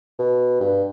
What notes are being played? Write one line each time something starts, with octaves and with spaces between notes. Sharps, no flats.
B2
G2